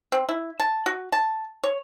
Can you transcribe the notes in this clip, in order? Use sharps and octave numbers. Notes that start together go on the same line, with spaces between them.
C4
E4
A5
F#4
A5
C#5